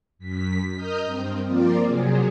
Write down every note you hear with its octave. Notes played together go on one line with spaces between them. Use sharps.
F#2 B6
A#4 D#5 D#6 F6 G6
G2 C4
F3 A#3 C4 F4 A#4 D5
C3 F#3 G#4